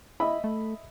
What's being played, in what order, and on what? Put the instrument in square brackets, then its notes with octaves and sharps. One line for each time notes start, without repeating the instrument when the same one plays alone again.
[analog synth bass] E4 [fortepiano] D#5 E5 B5
[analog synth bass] A3